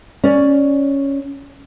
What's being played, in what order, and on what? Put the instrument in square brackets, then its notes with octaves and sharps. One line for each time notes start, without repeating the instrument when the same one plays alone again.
[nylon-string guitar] C#4 D5